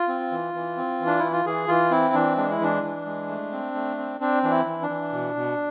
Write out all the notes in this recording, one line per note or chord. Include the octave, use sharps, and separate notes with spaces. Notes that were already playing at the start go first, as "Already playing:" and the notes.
Already playing: F4
C4
E3
E3
C4
E3
D4
E3 E4
F4
E3 G#4
E3 F4
C4 E4
E3 D4
G#3 D4
E4
E3 D4
E3
G#3
A3
C4
A3
C4
C4 D4
E3 D4
E4
E3
D4
E3
B2
B2